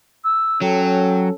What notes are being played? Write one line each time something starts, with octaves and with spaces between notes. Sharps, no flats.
E6
F#3 C#4 A4 G5